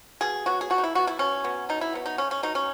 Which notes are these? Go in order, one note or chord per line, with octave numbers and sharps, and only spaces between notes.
B2 G#4
F#3 B3 F#4
G#4
B2 F#4
D#4
E4
F#3 B3 F#4
E4
B2 C#4
F#3 B3
B2 D#4
E4
F#3 B3
D#4
C#3 C#4
C#4
F#3 B3 D#4
C#4